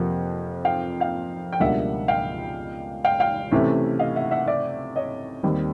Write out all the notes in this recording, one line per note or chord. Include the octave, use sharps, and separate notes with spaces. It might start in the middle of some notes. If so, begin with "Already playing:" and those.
Already playing: F2 C3 F3 A#3 F#5
F5 G5
F5 G5
G5
C#2 B2 G3 A#3 D4 E5 F#5
F5 G5
F5 G5
F5 G5
C3 E3 A3 C#4
D#5 F5
E5 F#5
E5 F#5
D5 E5
C#5 D#5
D#2 D#3 G3 C4